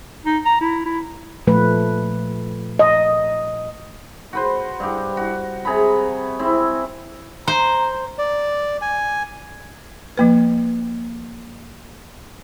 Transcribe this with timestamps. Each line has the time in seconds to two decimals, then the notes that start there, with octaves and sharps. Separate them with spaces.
0.25 D#4
0.45 A#5
0.61 E4
0.86 E4
1.47 A#2 F3 A3 B4
2.79 D#5
4.33 F#4 B4 C5
4.80 G2 G4
5.17 F#4
5.65 C3 G#4 A#5 B5
6.39 C4 E4
7.48 C5 A#5
8.18 D5
8.82 G#5
10.17 F3 A#3 B4